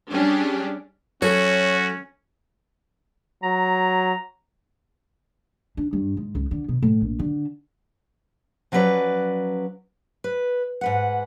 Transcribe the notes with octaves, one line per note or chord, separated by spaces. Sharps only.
G3 C#4 D4 G4 G#4
F#3 C#4 F#4 A4 C#5
F#3 A#5
D4
G2
G#2
C#2
D3
B2
A2
A#1
D3
F3 F#3 C#4 A#4 B4 D5
B4
G#2 B4 F#5